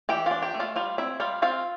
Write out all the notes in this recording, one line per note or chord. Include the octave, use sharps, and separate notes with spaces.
E3 G4 G5
D4 F4 F5
G4 G5
A3
F4 F5
G3 F4 F5
C4 E4 E5
G3 F4 F5
C4 F4 F5